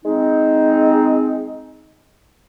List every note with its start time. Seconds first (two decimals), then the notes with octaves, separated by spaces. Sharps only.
0.05 G#3 C4 D#4